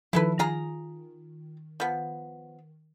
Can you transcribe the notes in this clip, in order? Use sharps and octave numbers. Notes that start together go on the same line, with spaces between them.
D#3 F3 E4 A4 B4
D#3 F4 G#4 A#5
F3 B3